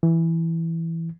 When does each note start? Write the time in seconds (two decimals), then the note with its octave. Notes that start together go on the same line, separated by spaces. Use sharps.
0.03 E3